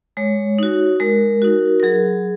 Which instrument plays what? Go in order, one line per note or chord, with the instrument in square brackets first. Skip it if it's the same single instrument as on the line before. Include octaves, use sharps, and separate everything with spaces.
[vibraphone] G#3 C#5
D#4 F#4
G#3 A#4
D#4 F#4
A#4
F#3 G#4